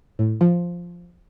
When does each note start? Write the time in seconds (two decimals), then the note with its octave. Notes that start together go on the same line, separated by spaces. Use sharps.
0.19 A2
0.41 F3